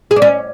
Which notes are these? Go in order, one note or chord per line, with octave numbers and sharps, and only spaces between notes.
G#4
D4
C#4